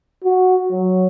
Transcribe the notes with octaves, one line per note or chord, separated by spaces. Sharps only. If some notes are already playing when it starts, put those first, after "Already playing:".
F#4
F#3